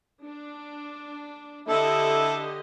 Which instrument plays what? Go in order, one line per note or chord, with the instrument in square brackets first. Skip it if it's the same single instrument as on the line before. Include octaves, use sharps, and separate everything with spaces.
[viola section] D4
[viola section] D3 G4 D#5 [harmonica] E4 A4